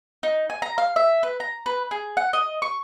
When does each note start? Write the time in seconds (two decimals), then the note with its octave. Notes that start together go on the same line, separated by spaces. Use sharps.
0.23 D#4
0.50 G#5
0.62 A#5
0.78 F5
0.96 E5
1.23 B4
1.40 A#5
1.66 B4
1.91 G#4
2.17 F#5
2.33 D#5
2.62 C#6